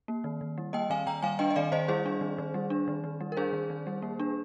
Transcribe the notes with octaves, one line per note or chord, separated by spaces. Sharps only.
A#3
D#3
D#3
G3
A#3 D#5 G5
D#3 F5 G#5
D#3 G5 A#5
G3 F5 G#5
D4 D#5 G5
D#5
D#3 D5 F5
D#3 C5 D#5
G3 G#4 C5
D4
D#3
D#3
G3
D4
D#3
D#3
G3
A#4
D4 G#4 C5
D#3
D#3
G3
A#3
D4